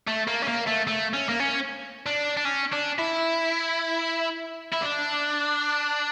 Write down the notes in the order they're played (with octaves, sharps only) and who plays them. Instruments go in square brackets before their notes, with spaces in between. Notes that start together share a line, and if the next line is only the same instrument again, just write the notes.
[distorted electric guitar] A3
A#3
C#4
A#3
A3
A3
C#4
A#3
C#4
D4
D4
C#4
D4
E4
E4
D4